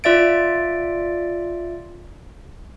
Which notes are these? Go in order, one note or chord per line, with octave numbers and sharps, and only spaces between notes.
F4 D5 E5 A6 D7